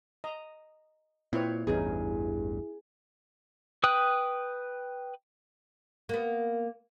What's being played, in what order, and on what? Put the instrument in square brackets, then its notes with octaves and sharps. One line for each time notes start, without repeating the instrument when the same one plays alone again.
[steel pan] D#5 A#5
[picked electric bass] A#2 [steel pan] C4 B4 C#5 [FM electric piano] E4
[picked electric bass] A1 E2 G2 [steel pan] B3 C#4 D#4 [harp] G#4
[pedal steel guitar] B4 G5 D#6 F#6
[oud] A#3 B3